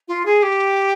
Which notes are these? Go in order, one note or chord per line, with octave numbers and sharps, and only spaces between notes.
F4
G#4
G4